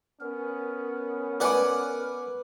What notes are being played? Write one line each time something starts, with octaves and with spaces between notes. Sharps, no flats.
B3 C#4 A#4
B4 D5 F#5 G#5 D6